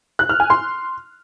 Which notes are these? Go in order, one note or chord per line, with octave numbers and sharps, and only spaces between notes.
F#6
F6
G#5
C6